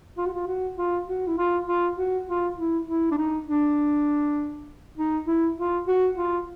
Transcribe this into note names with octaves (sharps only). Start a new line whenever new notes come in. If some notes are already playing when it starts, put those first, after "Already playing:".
F4
F#4
F4
F#4
F4
F#4
E4
F4
F4
F#4
F4
E4
E4
D4
D#4
D4
D#4
E4
F4
F#4
F4